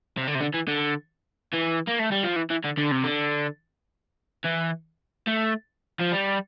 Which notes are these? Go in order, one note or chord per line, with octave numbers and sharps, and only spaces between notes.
C3
D3
C3
D3
E3
D3
E3
A#3
A3
G3
F3
E3
E3
D3
D3
C3
D3
E3
A3
F3
G3